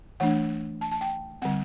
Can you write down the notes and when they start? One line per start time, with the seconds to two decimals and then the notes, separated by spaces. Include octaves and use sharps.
0.20 E3 A3 D4 F#5
0.81 A5
0.92 A5
1.01 G5
1.42 D3 G3 C4 F#5